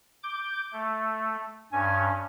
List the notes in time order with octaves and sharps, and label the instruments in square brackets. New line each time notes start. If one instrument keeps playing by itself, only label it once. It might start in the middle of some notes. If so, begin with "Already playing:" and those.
[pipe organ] D6 G6
A3
[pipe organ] G2 C#4 [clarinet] G#5